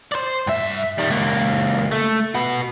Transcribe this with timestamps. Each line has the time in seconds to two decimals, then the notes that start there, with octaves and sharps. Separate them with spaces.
0.12 C5 D5
0.47 G2 E5
0.98 D#3 G3
1.10 C#2 A#3
1.92 A3
2.35 F#4 B4